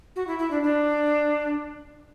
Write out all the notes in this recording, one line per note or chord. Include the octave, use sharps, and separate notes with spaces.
F#4
E4
E4
D4
D4